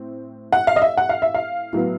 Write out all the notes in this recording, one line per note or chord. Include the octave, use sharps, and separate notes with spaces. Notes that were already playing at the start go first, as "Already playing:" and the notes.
Already playing: A2 C4
F#5
F5
D#5
E5
F#5
F5
E5
F5
A2 F#3 B3